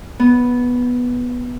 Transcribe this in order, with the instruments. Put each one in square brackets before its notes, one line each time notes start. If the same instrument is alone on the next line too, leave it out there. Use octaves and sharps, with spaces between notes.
[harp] B3